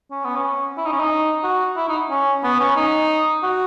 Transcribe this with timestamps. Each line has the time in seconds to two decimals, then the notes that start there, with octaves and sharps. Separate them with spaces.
0.11 C#4
0.24 B3
0.36 C#4
0.78 E4
0.85 D#4
0.92 C#4
1.00 D#4
1.44 F#4
1.77 E4
1.89 D#4
2.10 C#4
2.44 B3
2.60 C#4
2.76 D#4
3.43 F#4